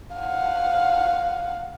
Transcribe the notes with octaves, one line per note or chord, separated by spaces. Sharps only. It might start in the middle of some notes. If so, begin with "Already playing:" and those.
F5 F#5